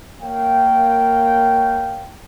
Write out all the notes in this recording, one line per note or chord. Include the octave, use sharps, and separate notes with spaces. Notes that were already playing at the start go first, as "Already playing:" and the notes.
A#3 A#4 C#5 F5 G5